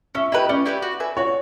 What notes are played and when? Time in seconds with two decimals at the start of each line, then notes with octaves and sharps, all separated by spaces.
0.15 C#4 E5
0.32 E4 G4 B4 D#5
0.49 C#4 D5
0.66 E4 G4 B4
0.82 F#4
1.00 B4 E5 G#5
1.17 F#4 C#5